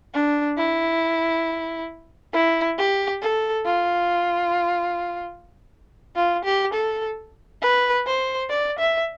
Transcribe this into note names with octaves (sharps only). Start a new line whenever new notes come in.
D4
E4
E4
G4
A4
F4
F4
G4
A4
B4
C5
D5
E5